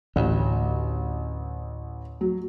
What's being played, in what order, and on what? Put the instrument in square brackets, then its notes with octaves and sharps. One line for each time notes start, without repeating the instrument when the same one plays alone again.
[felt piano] A1 [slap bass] D2
[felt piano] F#3